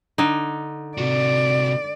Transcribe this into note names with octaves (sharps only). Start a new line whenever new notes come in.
D3 D#4
C3 F#4 D5